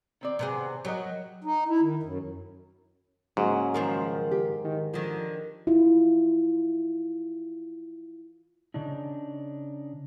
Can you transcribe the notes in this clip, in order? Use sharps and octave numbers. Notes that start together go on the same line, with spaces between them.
D#3 C4 D5
C3 B3 G#4
F#3 G4 A#4 D#5
D#4
E4
D#3
F#2
G#2 C#3 F#3 A#3 F#4
D#3 F3 A#4
G4
D#3
D3 D#3 F3
E4 F4
C#3 D4 D#4